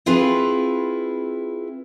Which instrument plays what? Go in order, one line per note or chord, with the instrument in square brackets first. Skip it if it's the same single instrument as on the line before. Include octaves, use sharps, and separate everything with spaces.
[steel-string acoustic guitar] C4 E4 F4 G#4 B4